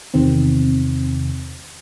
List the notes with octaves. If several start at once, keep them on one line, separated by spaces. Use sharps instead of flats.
E2 C3 D#3 C4